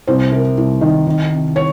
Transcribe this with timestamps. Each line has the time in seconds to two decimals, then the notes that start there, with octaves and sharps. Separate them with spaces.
0.07 C2 C5
0.31 C3 A#4
0.57 C2
0.81 D#3
1.07 D#3
1.31 C3
1.56 C#5